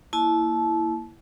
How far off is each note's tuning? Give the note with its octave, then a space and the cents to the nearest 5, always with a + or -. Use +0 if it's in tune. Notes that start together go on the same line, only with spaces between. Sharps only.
A#3 +0 E4 +0 A5 -25